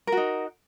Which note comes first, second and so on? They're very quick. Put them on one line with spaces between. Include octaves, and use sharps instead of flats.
A#4 F#4 D#4